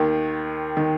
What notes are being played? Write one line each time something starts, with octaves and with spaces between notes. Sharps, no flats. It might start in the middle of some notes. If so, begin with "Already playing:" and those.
Already playing: D#2 D#3
D#3